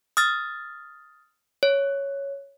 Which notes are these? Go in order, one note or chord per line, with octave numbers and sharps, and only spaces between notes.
D#6 F6 A6
C#5